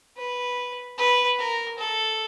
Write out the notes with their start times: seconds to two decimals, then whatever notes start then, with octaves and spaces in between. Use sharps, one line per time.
0.17 B4
0.98 B4
1.39 A#4
1.79 A4